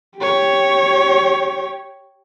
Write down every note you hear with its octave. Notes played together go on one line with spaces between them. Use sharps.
G4 C#5